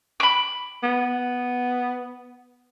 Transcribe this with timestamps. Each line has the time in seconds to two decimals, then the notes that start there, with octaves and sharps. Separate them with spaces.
0.20 B5 D6
0.83 B3